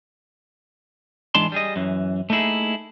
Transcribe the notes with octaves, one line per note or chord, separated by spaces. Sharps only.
G#2 E3 G#3 D4 A5 C6
G3 G#4 D#5
F#2 E3
A3 A#3 D#4 E4 G#4